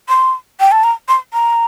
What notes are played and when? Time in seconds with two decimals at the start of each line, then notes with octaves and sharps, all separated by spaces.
0.09 C6
0.60 G5
0.72 A5
0.84 A#5
1.08 C6
1.33 A#5